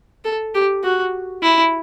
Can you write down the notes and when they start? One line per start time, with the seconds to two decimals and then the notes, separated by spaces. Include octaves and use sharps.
0.25 A4
0.54 G4
0.83 F#4
1.42 E4